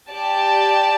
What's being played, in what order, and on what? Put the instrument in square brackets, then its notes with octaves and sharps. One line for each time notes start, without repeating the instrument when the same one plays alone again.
[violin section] G4 D5 A5